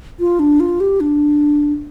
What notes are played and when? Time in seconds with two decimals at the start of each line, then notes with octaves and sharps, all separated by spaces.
0.20 F4
0.39 D4
0.60 F4
0.80 G4
1.00 D4